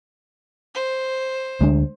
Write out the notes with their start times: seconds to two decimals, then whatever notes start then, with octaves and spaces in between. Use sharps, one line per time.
0.75 C5
1.61 D2 G#3 D4